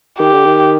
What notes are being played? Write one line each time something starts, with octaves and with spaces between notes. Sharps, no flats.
D#3 G4
D3
D#3